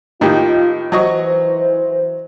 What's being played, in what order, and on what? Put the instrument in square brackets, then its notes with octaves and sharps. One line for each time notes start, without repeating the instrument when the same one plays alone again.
[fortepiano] A2 D#3 A#3 [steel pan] D#4 G4 [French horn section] F4
[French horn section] E3 C5 [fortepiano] F#3 D#5 C#6